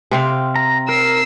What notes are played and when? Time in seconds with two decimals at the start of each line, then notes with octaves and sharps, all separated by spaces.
0.11 C3 C4 F5
0.56 A#5
0.89 A#4 E6 C7